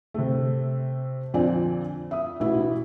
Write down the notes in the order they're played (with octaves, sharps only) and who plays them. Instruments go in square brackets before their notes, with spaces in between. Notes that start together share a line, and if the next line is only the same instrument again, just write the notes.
[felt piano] C3 A3
F2 A#2 D3 C4 D5 G#5
E5 D#6
A1 B2 E4